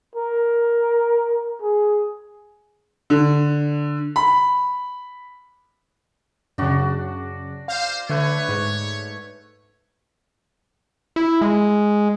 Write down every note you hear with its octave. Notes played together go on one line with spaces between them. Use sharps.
A#4
G#4
D3
B5
F#2 C#3 D4 F#4
C5 F5
D3 A3 B4 C#5
G#2
E4
G#3